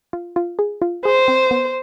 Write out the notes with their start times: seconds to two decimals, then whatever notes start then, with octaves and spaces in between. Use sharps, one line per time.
0.13 F4
0.36 F4
0.59 G#4
0.82 F4
1.05 G#4 C5
1.28 C4
1.51 B3